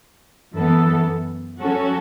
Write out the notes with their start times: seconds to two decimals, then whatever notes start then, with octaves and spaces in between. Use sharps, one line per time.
0.56 F#2 E3 B3 A4
1.61 F#3 C#4 F#4 A4